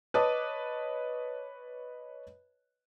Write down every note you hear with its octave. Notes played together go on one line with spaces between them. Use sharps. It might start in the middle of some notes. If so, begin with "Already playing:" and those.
B4 C#5 D#5 A5 D6 D#6